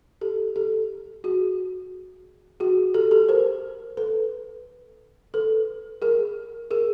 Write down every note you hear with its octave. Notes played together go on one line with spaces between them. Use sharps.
G4 A4
G4 A4
F#4 G#4
F#4 G#4
G4 A4
G4 A4
A#4 C5
A4 B4
A4 B4
G#4 A#4
G#4 A#4